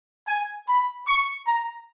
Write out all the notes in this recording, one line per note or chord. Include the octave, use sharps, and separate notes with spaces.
G#5
B5
C#6
A#5